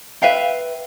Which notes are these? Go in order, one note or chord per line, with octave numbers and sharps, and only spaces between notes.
B4 E5 F5 G5